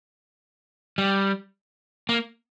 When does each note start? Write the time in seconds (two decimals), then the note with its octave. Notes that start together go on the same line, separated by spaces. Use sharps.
0.98 G3
2.09 A#3